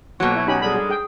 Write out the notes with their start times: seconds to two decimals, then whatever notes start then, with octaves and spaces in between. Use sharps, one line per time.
0.20 F2 B2 F#3 A#3 C#6
0.35 E4 C#5
0.47 C#4 D#4 G4 B5
0.61 D3 G3 G#3 G#4 B5
0.75 G#4
0.90 G#4 G5